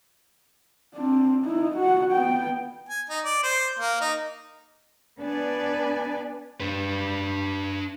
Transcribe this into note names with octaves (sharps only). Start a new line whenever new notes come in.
C4 D4
D#4 E4
F#4 F#5
B3 G5
G#5
D#4
D5
C5
A#3
D#4
B3 D4 B4 D5 G#5
D4 B4